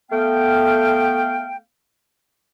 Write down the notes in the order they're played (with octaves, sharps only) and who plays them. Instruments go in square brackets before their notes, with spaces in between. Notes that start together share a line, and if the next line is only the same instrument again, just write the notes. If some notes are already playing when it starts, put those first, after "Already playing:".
[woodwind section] A3 B3 F5 G5